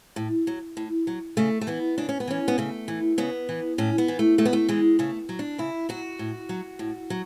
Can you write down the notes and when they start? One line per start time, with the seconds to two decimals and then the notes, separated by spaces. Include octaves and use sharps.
0.16 A2
0.47 F#3
0.77 A2
1.07 F#3
1.37 C#3 A3
1.61 A3
1.67 E3 B3
1.98 C#3 D4
2.09 C#4
2.20 B3
2.27 E3 C#4
2.48 B3
2.58 C#3 A3
2.88 E3
3.18 C#3 B3
3.49 E3
3.78 A2 C#4
3.98 B3
4.08 E3
4.19 A3
4.38 A2 A3
4.45 B3
4.53 A3
4.69 E3 G#3
4.99 C#3 A3
5.29 F#3
5.39 D4
5.58 C#3 E4
5.89 F#3 F#4
6.19 A2
6.49 F#3
6.79 A2
7.10 F#3